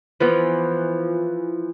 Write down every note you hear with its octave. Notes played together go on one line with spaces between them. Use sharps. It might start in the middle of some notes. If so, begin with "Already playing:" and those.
E3 F3 B3